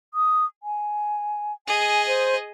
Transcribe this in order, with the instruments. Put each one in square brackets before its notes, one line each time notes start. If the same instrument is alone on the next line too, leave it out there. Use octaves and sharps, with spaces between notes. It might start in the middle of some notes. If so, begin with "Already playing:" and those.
[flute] D#6
G#5
[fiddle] G#4 D#5 [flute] G#5
[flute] C5